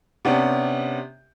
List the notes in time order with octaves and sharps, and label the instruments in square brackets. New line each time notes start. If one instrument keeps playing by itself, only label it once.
[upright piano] C3 B3 C#4 D4 G4